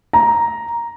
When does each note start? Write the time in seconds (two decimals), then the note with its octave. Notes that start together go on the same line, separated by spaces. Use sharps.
0.13 A#5